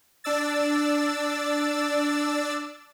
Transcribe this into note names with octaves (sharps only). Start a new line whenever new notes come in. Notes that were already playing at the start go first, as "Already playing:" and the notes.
D4 D5 E6 A6